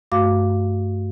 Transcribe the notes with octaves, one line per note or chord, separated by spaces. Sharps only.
G2 A3 F#4 F5 D6